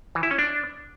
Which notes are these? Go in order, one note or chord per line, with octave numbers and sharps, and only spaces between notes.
E3
E4
C#4
D4